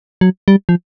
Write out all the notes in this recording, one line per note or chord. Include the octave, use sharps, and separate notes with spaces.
F#3
G3
F3